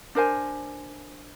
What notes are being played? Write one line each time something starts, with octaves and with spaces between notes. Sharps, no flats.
D4 A#4 C5 G#5